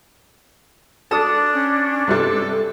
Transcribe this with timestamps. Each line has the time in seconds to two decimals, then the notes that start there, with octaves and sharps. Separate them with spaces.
1.11 D4 A4 A5 D#6
1.54 C#4
2.08 G2 C3 G3 A4